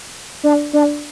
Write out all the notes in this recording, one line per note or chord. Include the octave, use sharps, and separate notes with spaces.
D4
D4